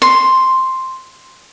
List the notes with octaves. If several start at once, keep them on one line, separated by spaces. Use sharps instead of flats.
C6